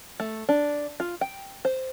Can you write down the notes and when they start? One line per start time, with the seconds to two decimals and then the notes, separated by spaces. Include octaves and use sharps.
0.20 A3
0.49 D4
1.00 F4
1.21 G5
1.65 C5